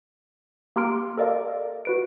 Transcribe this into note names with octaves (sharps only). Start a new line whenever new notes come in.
A#3 G4 A#5 C6 F6 D7
A4 A#4 D5 D#5 F5
F#4 B4 D7